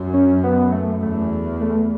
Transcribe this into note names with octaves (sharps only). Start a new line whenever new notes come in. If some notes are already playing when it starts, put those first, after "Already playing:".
Already playing: F#2
C#4
B3
A3
E2 A3
A3